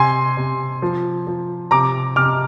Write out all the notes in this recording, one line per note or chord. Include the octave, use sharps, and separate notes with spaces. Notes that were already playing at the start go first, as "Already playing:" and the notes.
Already playing: C3 G#5 C6
C3
F3
F3
C3 A#5 D6
C3 D6 F6